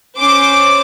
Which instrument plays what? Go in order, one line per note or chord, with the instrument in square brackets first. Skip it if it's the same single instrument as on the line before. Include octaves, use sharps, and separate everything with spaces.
[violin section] C#4 C5 D6